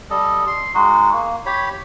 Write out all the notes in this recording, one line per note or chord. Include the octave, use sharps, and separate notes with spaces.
G3 A4 D#5
C6
G#3 D#4 F#4
A#3
G4 C#5 B5